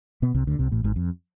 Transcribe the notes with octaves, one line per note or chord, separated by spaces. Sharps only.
B2 B3
C2 C3
D2 D3
C2 C3
A1 A2
G#1 G#2
F2